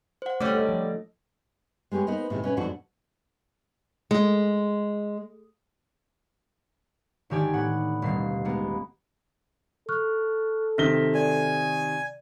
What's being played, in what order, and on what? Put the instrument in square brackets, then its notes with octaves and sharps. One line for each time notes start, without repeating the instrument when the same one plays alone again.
[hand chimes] C5 F#5
[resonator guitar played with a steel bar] D3 G3 [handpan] A3 [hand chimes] C#5 D6
[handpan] A4 D#5
F3
[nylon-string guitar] G#3 B3 G4 G#4 C#5
B3 D#4 A#4 C5
A2 C3 D#3 G#3
B2 C#4 B4
F2 G#2 B2 D3 D4 F#4
[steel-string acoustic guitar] G#3
[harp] G#1 D3 D#3 G4 D5 G#5
A2 B3 F#5
D#1 B2 C7
G#3 A#3 B3
[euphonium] A4 [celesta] C#6 F6 F#6
[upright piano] C3 D#3 G7 [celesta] F6 A#6 B6
[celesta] D5 [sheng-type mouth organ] G#5